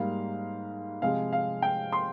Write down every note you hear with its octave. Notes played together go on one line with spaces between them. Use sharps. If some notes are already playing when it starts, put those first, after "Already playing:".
Already playing: G#2 G3 A#3 F5
C3 F3 G#3 F5
F5
G5
C6